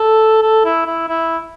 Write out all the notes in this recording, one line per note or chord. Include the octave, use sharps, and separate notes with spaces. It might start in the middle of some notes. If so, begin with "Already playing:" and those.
Already playing: A4
A4
E4
E4
E4